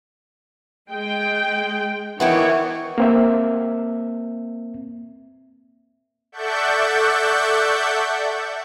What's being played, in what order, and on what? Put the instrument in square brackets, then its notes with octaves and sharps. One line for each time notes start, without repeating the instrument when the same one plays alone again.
[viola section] G#3 G5
[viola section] D#3 E3 C#5 [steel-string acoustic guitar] B3 E4 G5
[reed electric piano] A#3 C4 E5
[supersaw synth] A4 D5 E5 F#5 C#6 G6